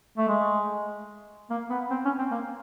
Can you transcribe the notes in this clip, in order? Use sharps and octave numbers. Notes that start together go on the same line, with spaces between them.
A3
G#3
A#3
B3
C4
C#4
C4
A#3